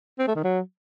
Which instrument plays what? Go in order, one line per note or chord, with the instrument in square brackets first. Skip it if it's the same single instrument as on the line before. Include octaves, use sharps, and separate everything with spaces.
[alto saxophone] C4
A3
D#3
F#3